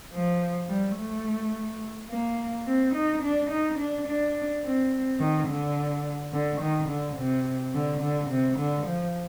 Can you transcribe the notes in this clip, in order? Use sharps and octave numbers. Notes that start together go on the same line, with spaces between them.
F3
G3
A3
A#3
C4
D#4
D4
D#4
D4
D4
C4
D#3
D3
D3
D#3
D3
C3
D3
D3
C3
D3
F3